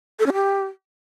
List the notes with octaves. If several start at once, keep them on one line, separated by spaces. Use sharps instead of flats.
A4
C#4
G4